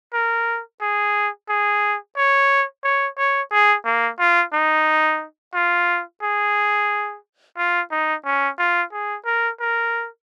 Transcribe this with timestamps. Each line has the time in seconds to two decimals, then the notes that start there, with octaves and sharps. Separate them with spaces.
0.13 A#4
0.81 G#4
1.49 G#4
2.17 C#5
2.84 C#5
3.18 C#5
3.52 G#4
3.85 A#3
4.19 F4
4.53 D#4
5.54 F4
6.22 G#4
7.57 F4
7.91 D#4
8.25 C#4
8.59 F4
8.92 G#4
9.26 A#4
9.60 A#4